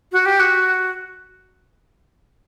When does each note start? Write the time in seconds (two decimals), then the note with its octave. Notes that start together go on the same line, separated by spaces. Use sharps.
0.12 F#4
0.26 G4
0.40 F#4